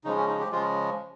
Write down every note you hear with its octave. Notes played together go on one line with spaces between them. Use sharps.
C#3 F3 G#3 D#4
C#4
D#4
G4
C#3 F3 G#3 F4